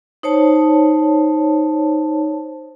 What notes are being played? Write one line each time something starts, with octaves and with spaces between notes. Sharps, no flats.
D#4 C5 C#5 A5